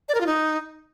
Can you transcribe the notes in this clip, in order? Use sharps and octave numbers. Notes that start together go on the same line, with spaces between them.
D5
A#4
F4
D#4